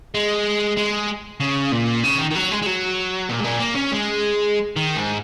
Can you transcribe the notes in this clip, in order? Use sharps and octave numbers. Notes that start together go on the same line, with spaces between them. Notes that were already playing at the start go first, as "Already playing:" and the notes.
G#3
G#3
C#3
A#2
C#3
D#3
D#3
F#3
G#3
G#3
F#3
A#2
G#2
A#2
A#3
C#4
G#3
D#3
G#2